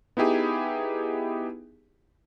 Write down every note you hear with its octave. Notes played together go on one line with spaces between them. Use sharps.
B3 D#4 E4 G4 G#4